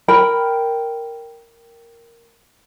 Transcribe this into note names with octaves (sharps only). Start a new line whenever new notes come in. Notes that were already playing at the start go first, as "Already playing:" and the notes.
A#4 G5 B5